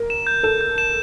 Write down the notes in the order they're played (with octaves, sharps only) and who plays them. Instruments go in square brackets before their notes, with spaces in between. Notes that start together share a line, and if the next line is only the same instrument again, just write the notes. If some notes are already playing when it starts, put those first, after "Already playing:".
Already playing: [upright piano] A#4
[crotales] E7
G6
[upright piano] A4 [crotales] E7
[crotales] G6
E7